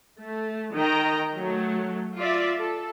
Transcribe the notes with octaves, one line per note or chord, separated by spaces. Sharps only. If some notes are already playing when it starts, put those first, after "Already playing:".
A3
D#3 D#5 G5 A#5
F#3 A3
F4 D5 E5
A4